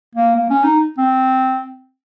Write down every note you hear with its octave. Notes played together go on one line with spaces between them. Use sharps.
A#3
A#3
C#4
D#4
C4